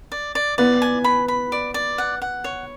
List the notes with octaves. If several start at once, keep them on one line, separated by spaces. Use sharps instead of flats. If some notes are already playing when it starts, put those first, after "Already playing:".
D5
D5
B3 D5
G#5
B5
B5
D5
D5
F#5
F#5
C#5